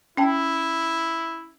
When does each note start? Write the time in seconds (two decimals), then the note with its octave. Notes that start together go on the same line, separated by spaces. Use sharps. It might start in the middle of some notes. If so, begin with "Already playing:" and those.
0.17 C#4 E4 G5 A5